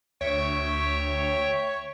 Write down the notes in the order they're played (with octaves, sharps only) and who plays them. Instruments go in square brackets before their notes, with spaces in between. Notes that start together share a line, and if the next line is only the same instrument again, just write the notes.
[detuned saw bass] D2 [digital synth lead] C#5 [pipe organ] E5 G5